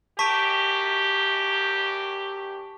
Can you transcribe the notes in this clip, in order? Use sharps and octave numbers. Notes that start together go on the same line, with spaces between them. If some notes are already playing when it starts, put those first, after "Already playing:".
F#2 G4 A5 C#6 B6